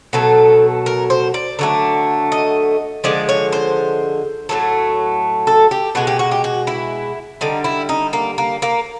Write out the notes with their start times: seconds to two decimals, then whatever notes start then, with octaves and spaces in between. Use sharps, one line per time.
0.13 B2 F#3 A3 A4
0.86 A#4
1.10 C5
1.34 D5
1.59 D3 F#3 A3
2.32 D#5
3.04 D3 F3 G#3 D5
3.29 C#5
3.53 C5
4.49 A2 F#3 A3
5.47 A4
5.71 G4
5.95 B2 G#3 F#4
6.07 G4
6.19 F#4
6.31 G4
6.44 F#4
6.67 E4
7.41 D3 G3 D#4
7.64 E4
7.89 D#4
8.13 A#3
8.38 A#3
8.62 A#3